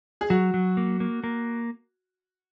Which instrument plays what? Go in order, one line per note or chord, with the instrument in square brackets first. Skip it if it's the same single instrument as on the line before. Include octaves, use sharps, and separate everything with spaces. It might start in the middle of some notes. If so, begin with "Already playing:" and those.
[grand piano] G#4
[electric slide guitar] F#3 [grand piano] F#4
[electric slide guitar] F#3
A#3
A#3
A#3